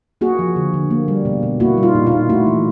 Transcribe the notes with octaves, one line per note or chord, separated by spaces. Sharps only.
A#3 F#4 G#4
F3
D3
D3
A#3
G3
B2
B2
A#3 E4 F#4
G3
D#4 F4
A#2
D#4 F4
A#2
A3 E4 F#4
E3